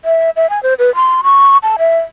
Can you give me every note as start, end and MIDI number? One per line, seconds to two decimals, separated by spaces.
0.05 0.30 76
0.36 0.49 76
0.50 0.62 80
0.63 0.74 72
0.79 0.93 71
0.95 1.21 84
1.23 1.58 85
1.63 1.76 81
1.79 1.98 76